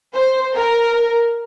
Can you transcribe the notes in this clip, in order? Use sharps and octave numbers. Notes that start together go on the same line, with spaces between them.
C5
A#4